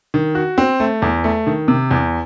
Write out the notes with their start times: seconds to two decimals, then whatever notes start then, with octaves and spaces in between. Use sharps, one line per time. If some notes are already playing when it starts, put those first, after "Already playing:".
0.14 D#3
0.35 F#4
0.58 C4
0.80 A3
1.02 E2
1.24 A3
1.47 D#3
1.68 C3
1.91 E2